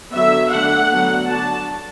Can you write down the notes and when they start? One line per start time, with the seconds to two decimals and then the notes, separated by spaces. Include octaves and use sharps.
0.13 D3 F#3 B3 E5
0.51 D3 A3 D4 F#5
0.90 D3 F#3 B3 D4
1.28 F#3 D4 A5